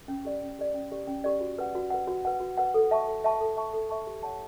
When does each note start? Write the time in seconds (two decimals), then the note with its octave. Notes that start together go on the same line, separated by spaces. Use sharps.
0.08 C#4
0.25 G4 D5
0.42 C#4
0.59 G4 D5
0.74 C#4
0.91 G4 D5
1.07 C#4
1.24 G4 D5
1.41 F#4
1.58 B4 F#5
1.75 F#4
1.90 B4 F#5
2.07 F#4
2.25 B4 F#5
2.40 F#4
2.57 B4 F#5
2.74 A4
2.91 E5 A5 C#6
3.08 A4
3.24 E5 A5 C#6
3.40 A4
3.56 E5 A5 C#6
3.73 A4
3.90 E5 A5 C#6
4.07 G4
4.23 C#5 F#5 A5